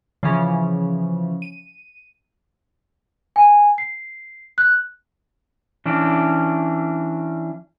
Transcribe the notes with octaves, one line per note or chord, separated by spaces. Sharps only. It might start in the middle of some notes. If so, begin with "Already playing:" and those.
C#3 E3 F3 C#4
D#7
G#5
C7
F#6
E3 C#4 D4